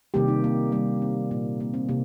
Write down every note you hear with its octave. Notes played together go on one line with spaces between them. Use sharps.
C3 D#3 G3 A#3 G4
D#4
A#3
D#3 G3 A#3
C4
A#2 A#3
A#3
C4
C3 A#3